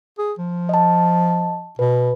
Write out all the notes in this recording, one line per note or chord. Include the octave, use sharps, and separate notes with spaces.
G#4
F3
D#5 A5
B2 B4